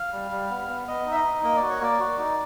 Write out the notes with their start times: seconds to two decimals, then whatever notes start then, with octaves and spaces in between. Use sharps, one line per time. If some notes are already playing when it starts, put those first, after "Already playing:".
Already playing: F5
0.13 G3
0.31 G3
0.50 B3
0.68 B3
0.88 B3 D#5
1.06 D#4 E5
1.15 D#5
1.24 D#4
1.43 A#3 D#5
1.57 D5
1.62 F#4
1.70 C#5
1.81 A#3 D5
1.99 F#4
2.18 D#4